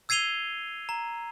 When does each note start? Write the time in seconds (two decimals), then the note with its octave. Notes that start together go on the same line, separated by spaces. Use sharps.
0.09 E6 G#6 C7 D#7 F7 G7
0.89 A#5